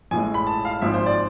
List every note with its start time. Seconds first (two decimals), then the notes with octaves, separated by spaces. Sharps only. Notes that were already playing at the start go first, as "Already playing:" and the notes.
0.11 A1 A2 G#3 G#5
0.34 B5
0.47 A5
0.65 F5
0.82 G#1 G#2 F3 E5
0.94 C5
1.06 D5